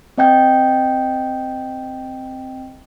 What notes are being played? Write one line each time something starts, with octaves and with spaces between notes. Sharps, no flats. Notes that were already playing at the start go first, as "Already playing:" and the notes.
C4 D#5 G5 G6